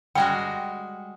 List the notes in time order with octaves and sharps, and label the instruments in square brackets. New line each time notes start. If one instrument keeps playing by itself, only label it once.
[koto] G3 G#3 F#4 [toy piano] G5